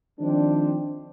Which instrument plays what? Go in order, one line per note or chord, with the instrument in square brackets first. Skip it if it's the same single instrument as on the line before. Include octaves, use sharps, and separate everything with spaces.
[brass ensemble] D#3 F3 G#3 C4 D4